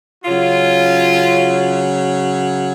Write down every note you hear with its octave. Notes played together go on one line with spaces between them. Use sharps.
C#3 F#3 C#4 F4